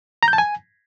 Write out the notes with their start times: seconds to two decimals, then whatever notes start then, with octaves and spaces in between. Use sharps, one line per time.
0.23 A#5
0.28 G6
0.33 A5
0.38 G#5